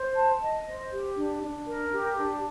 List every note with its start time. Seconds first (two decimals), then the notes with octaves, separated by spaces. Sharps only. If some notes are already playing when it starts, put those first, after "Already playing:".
Already playing: C5
0.16 A5
0.41 D#5
0.67 C5
0.92 G4
1.17 D4
1.43 D4
1.67 A#4
1.92 G4
2.18 D4